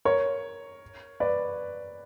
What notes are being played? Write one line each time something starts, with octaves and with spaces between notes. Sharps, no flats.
A#4 C#5
B4 D5